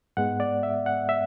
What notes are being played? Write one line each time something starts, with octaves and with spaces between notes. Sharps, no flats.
G#2 G#3 B3 F#5
D5
E5
F#5
E5